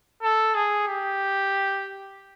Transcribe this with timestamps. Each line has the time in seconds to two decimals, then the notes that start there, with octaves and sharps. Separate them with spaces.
0.23 A4
0.55 G#4
0.88 G4